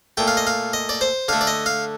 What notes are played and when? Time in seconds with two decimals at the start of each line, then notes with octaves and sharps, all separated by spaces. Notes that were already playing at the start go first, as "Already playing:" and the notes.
0.17 A#2 A3 G5
0.28 F5
0.37 D#5
0.47 F5
0.73 D#5
0.89 D5
1.01 C5
1.28 D3 A3 F5
1.41 D5
1.47 D#5
1.66 F5